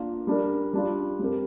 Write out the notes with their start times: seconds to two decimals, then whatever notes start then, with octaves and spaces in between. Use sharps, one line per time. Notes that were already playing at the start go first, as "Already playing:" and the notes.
Already playing: A#3 D4 F4 A#4
0.27 G3 D4 A#4
0.73 G3 D4 F4
1.19 G3 C4 G4 A#4